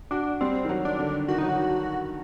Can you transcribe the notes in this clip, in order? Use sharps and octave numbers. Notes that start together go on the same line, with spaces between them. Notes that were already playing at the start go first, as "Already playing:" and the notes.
D4 F#4
G3 C4
D#3
F#3
D4
D3
D#3 F#4
F#3 D#4
F#4
D#3